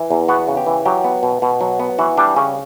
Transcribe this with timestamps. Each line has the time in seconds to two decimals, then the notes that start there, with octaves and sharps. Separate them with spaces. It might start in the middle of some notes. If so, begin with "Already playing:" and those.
Already playing: E3
0.11 E2
0.28 B3 F#4
0.48 C#3
0.57 G4
0.66 E3
0.85 F#3 G4
1.04 B3
1.23 B2
1.42 B2
1.61 F#3
1.80 B3
1.99 E3 F#4
2.17 G3 D4
2.36 C#3 C#4